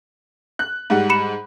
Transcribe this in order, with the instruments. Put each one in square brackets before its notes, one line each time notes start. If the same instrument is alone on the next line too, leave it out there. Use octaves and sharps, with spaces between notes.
[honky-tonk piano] F#6
G#2 G3 F#5
[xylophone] B5 C#7 E7